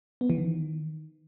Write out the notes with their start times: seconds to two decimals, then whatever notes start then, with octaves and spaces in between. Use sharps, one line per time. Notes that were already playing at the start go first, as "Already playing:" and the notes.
0.21 B3
0.30 E3
0.38 D#3